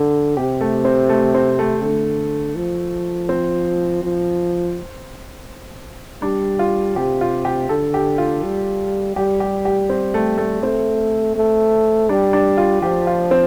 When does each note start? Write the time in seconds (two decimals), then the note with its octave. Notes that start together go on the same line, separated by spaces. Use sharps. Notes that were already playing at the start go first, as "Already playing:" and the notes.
Already playing: D3
0.37 C3 G4
0.61 A3
0.85 C4
1.09 A3
1.34 C4
1.59 A3
1.83 D3
2.56 F3
3.29 C4
4.03 F3
6.22 G3 D4
6.59 F4
6.96 C3 G4
7.21 F4
7.45 G4
7.69 D3 A4
7.94 G4
8.18 F4
8.43 G3
9.16 G3 G4
9.40 G4
9.65 G4
9.90 C4
10.14 A3
10.38 A3
10.62 A3 C4
11.36 A3
12.09 G3 D4
12.33 D4
12.58 F4
12.82 F3 G4
13.07 F4
13.31 C4